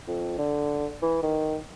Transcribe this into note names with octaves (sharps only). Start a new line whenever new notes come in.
F2
D3
E3
D#3